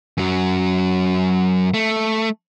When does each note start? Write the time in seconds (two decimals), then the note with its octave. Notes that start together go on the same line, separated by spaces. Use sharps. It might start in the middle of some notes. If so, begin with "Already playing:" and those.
0.18 F#2 F#3
1.74 A3